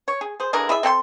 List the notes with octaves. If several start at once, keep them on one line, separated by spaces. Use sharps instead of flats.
C#5
G#4
G#4 C5
D3 E3 G#4 A#4
E4 G#4 D5 E5
C4 A4 G5 C6